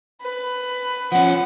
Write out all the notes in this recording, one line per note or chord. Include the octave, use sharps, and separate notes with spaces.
B4
F3 C#4 F#5